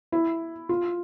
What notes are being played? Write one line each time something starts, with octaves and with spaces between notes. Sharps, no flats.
E4
F4